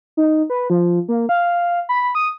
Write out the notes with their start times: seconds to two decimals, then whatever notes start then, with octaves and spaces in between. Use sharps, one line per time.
0.17 D#4
0.50 B4
0.70 F3
1.09 A#3
1.29 F5
1.89 B5
2.15 D#6